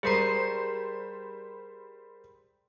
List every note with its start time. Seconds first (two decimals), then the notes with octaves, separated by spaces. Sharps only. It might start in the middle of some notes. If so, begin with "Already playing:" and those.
0.03 G3 G#4 A#4 C5 A#5 C7